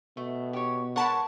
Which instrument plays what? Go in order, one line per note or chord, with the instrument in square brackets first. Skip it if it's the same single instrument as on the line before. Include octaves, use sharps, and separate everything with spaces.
[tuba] B2 [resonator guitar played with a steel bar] A3
[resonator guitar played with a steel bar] G4 C#5
[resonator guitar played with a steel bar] G#3 A#4 C#5 [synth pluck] F#5 A5 B5